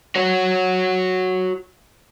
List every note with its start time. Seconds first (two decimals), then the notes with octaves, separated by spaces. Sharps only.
0.16 F#4 C#5